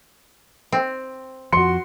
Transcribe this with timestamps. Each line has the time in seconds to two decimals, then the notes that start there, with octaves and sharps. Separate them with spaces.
0.72 C4
1.52 F2 F3 F#4 C6 C#7